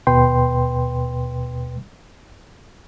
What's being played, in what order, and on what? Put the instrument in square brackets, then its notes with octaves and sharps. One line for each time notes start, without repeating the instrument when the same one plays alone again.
[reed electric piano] D#2 B2 B4 G5 C6